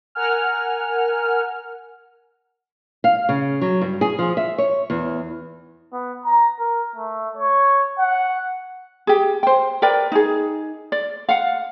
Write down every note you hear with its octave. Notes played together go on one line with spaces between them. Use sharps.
A#4 F#5 G#5 F6
F5
C#3
F#3
G2
G#4
F3
E5
C#5
E2
B3
A#5
A#4
A3
C#5
F#5
G4 G#4
C5 G5
A#4 B4 D5 G5
D#4 G#4
D5
F5 F#5